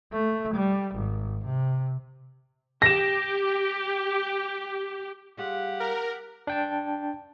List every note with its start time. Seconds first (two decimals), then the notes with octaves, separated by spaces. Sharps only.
0.13 A3
0.55 G3
0.95 G#1
1.46 C3
2.82 G4 A#6 E7
5.37 G3 F4 G4 G#4 F#5
5.80 A#4
6.47 D4 G5 A5